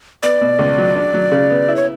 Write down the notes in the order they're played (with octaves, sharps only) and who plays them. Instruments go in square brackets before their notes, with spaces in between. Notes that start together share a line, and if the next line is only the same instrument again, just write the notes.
[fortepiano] B3 [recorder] D5
[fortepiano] B2
C#2
F#3
D4
F#3
C#3
B3
E4
[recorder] C#5